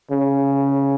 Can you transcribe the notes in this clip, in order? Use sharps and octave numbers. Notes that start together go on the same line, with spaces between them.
C#3